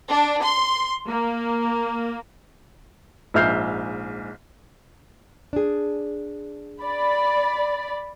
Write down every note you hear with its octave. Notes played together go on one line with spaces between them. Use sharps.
D4
C6
A#3
A#1 G#2 E5 F6 G6 C7
D4 G#4
D5 B5